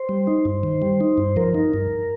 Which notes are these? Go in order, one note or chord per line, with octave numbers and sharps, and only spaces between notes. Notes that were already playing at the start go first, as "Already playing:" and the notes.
Already playing: C5
G3
D#4
G2
D#3
G3
D#4
G2
F3 A#4
D#4
G2